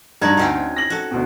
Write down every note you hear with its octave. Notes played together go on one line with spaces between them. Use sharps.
G2 D#4 F#4 D5 A#5 G#6
D2 C4 C#4 D#4
A#6 F#7
F#4 A4
D2 B2